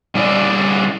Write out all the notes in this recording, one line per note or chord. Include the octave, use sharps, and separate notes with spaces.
G3 C#4 D4 E4 D5 D#5